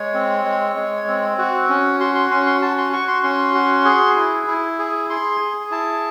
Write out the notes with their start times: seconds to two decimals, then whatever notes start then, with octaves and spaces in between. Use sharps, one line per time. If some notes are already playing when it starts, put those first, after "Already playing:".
Already playing: G#3 C#5
0.14 C4
0.45 G#3
0.75 G#3
1.07 C4
1.38 F#4
1.69 C#4
2.00 F#4 C6
2.15 C6
2.31 C#4 C6
2.46 C6
2.62 F#4 A5
2.78 C6
2.93 F#4 C#6
3.08 C6
3.23 C#4 C6
3.54 F#4
3.85 G#4
4.16 E4
4.47 E4
4.79 G#4
5.10 G#4 C6
5.40 G#4
5.71 E4 A5